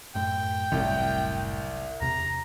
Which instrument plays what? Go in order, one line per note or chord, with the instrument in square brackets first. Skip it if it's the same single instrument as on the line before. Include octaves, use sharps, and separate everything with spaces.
[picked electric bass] F#2 A2 [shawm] G5
[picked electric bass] F#1 A2 F#3 [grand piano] C2
[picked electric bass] E2 C3 [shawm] A#5